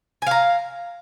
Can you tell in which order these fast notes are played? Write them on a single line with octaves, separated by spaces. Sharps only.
G#5 F5 A#5